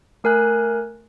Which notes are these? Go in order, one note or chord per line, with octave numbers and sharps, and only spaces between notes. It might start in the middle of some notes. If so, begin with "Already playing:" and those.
A3 A#4 G#5 F#6